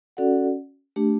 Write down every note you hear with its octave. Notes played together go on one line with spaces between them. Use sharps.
C#4 F#4 A4 D5 F#5
A3 D4 G4